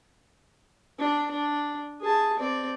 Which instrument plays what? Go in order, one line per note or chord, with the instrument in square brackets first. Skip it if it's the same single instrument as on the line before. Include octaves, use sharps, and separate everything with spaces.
[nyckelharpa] D4
D4
G#4 A5
C4 D5